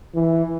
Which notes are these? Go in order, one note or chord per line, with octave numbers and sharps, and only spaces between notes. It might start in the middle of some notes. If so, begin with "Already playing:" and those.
E3